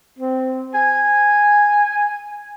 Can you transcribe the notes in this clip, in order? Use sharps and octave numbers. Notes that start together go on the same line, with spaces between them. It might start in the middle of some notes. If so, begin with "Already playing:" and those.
C4
G#5